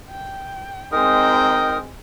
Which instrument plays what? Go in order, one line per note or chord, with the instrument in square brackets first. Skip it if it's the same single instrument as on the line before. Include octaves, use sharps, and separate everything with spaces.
[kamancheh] G5
[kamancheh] G#3 C4 [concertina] D#4 A#4 [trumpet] G5 [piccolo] D#6